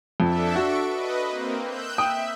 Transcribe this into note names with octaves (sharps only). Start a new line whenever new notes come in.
F2 D4 A4 E5
F#4 C#6 D7
B4 D#5
A#3 C4
E6 F#6 G6
E5 G5 D#6